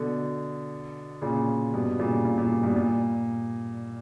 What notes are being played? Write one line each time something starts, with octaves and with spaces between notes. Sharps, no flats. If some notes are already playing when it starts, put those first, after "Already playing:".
Already playing: B2 D3
A#2 C#3
G2 B2
A#2 C#3
A#2
A#2
G2 B2
A#2